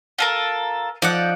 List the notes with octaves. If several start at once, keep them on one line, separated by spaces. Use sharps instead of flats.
F4 A4 A#4
F3 D#4 D5 F#5